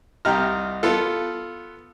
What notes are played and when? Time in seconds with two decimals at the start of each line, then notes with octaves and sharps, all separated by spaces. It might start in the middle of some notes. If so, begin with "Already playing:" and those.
0.25 C2 C3 D#4 G4 A#5 F6
0.83 B3 F4 A4